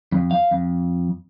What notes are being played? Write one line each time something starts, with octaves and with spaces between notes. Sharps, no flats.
F2
F5
F2